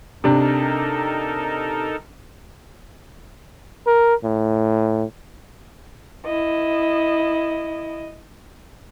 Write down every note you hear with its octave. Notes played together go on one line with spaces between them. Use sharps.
C3 D4 D#4 A4 A#4
A#4
A2
E4 D#5